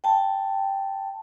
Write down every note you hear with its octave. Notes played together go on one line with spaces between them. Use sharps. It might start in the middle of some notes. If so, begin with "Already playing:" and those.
G5 A5